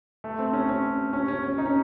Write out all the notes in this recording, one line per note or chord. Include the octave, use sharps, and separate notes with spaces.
A3
C4
C#4
C#4
C#4
C#4
C#4
D#4
C#4